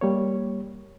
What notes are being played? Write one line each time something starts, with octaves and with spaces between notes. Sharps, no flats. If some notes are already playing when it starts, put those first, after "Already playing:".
G3 A#3 C#5